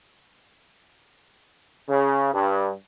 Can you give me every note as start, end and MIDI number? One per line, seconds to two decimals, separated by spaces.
1.90 2.32 49
2.34 2.72 43